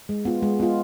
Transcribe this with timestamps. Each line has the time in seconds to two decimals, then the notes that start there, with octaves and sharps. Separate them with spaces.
0.09 G#3
0.25 B3 F4
0.43 G#3
0.60 B3 F4